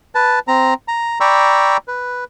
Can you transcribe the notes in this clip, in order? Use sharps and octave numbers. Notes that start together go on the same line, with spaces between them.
B4 A5
C4 A#5
A#5
D5 G5 A#5 B5 C#6 E6
B4